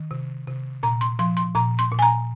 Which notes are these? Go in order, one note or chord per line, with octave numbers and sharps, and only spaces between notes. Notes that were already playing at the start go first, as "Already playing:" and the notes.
Already playing: D#3
C3
C3
A#2 A#5
C6
F3 C6
C6
A#2 A#5
C6
A#2
G#5
A#5